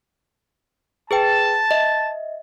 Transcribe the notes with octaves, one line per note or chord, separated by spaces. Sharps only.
G#4 B4 G5 A5
D#5 E5